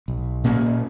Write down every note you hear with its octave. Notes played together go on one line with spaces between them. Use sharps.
B1
A#2 A#3 C#4